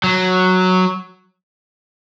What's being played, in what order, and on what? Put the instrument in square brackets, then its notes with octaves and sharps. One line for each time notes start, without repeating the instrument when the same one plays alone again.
[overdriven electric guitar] F#3